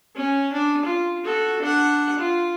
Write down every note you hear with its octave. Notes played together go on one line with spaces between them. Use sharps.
C#4
D4
F4
F#4 A4
D4 F#5
F4